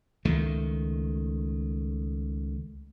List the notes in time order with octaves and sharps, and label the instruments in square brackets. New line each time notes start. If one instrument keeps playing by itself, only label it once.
[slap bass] C#2 D#3 A3